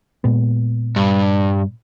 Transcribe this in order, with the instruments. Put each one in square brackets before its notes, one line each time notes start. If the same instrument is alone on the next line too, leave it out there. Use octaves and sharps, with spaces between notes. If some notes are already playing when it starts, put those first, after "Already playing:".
[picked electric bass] A#2 G#3 B3
[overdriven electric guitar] G2